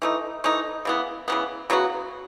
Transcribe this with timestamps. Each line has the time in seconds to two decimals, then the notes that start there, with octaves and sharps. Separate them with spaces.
0.02 E3 A3 D#4
0.44 E3 A3 D#4
0.85 C#3 E3 B3
1.28 C#3 E3 B3
1.70 C#3 F#3 B3 F#4